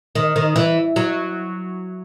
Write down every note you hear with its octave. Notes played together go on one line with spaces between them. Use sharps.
D#3
D#3
E3
F#3